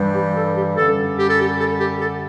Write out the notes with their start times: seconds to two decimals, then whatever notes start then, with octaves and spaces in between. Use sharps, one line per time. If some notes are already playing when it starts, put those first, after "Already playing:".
Already playing: G2 E3 G3
0.14 G4
0.35 A4
0.56 G4
0.76 F#2 D3 G3 A4
1.18 G4
1.29 A4
1.41 G4
1.59 A4
1.80 G4
2.00 A4